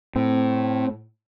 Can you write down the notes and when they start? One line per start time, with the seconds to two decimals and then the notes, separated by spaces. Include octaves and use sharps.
0.16 A2 C4